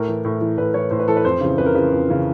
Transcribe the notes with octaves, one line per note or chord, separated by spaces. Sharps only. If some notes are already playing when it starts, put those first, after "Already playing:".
Already playing: A2 A#4
E3
A2
E3
A2 B4
E3 C#5
A2 C5
B4
E3 A4
B4
F2 C5
C#3 E3
F2 B4
A#4
C#3 E3 B4
F2
C#3 E3